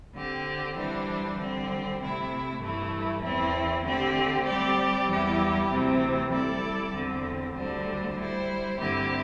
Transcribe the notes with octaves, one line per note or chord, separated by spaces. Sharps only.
D3 C4 G4
E3 G3 D4 C5
D3 G3 C4
C3 A3 E4
G2 E3 A3 E4
E2 E3 C4 E4
D3 A3 C4 G4
G3 C4 G4 D5
E2 E3 G3 E4 G4
D2 C3 E3 C4
G3 E4 A4 D5
E2 D3 C4
D2 D3 G3 D4 C5
G3 E4 C5
G2 D3 C4 E4 G4